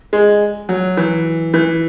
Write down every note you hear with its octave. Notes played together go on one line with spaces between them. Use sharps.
G#3
F#3
E3
E3